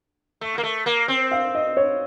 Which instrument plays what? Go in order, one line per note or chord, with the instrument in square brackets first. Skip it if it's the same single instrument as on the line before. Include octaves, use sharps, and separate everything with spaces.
[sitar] A3
A#3
A3
A#3
C4
[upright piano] F5
D#5
C#5